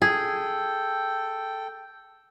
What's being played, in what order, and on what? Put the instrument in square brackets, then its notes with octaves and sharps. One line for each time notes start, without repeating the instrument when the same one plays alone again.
[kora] G#4 [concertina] A4 G5